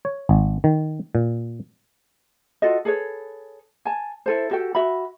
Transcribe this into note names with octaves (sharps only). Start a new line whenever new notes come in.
C#5
G#1
D#3
A#2
F4 F#4 A4 D#5
G#4 A4 B4 C#5
G#5 A5
E4 A4 C5
F#4 G4 A4 G5
F#4 E5 B5